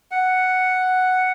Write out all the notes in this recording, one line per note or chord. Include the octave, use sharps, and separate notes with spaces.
F#5